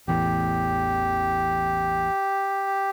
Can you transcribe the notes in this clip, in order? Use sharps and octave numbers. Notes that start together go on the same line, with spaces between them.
A1 E2 A2 G4